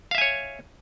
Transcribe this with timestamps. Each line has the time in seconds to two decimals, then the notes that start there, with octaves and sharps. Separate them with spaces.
0.11 F5
0.15 E5
0.18 G#5
0.21 C#5